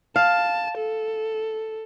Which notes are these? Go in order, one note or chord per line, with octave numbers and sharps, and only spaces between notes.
F5 A5
A4